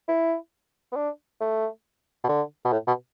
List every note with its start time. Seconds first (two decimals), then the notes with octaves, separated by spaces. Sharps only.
0.08 E4
0.92 B3
0.96 D4
1.41 A3
2.24 B2
2.29 D3
2.65 B2
2.73 A2
2.87 B2